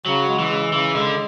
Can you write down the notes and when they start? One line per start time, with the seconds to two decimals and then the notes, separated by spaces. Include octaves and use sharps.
0.06 C#3 F#3
0.28 G#3
0.39 E3
0.51 C#3
0.73 C#3 E3
0.95 D3 G#3